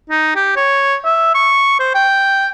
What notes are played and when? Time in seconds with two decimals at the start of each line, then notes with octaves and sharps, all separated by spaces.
0.10 D#4
0.36 G4
0.56 C#5
1.05 E5
1.35 C#6
1.80 C5
1.95 G5